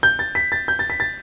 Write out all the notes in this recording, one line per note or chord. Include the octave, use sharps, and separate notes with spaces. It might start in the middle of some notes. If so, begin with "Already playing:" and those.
G6
A6
B6
A6
G6
A6
B6
A6